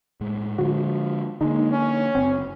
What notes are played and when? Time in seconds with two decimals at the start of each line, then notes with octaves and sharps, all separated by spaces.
0.21 A2 G#3
0.58 D3 F3 G#3 F#4
1.41 D3 G#3 A#3 D#4
1.72 C#4
2.15 F#1 C4